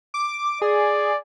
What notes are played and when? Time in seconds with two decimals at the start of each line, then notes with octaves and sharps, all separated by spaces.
0.14 D6
0.62 G#4 D5